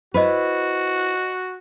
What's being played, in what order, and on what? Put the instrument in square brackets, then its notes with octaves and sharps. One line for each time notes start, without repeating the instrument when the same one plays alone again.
[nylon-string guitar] E4 B4 [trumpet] F#4 [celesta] C5 D#5